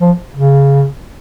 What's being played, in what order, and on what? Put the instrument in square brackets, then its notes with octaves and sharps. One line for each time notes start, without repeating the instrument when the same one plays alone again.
[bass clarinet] F3
C#3